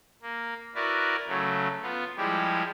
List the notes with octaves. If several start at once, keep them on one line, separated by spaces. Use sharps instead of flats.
A#3
E4 F#4 A#4 B4 D5
C#3 F#3 A3
B3 F4
F3 G3 G#3 E4 G4